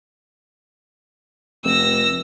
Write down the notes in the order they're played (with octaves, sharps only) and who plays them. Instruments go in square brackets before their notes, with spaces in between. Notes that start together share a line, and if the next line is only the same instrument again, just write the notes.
[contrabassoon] F1 [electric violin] E6 A#6